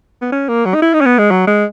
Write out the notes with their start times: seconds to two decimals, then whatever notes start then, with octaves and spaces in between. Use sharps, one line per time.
0.22 B3
0.32 C#4
0.49 A#3
0.66 F#3
0.75 D#4
0.82 E4
0.94 D#4
1.01 C#4
1.06 B3
1.18 G#3
1.31 F#3
1.47 G#3